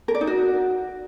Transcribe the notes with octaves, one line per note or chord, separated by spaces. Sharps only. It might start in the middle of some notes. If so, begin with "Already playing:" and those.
A#4
D5
D#4
F#4